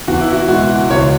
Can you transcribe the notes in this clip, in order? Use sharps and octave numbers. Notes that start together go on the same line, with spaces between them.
E2 F#4
E4
F#4
B2 G#3 F#4
C#2 C#5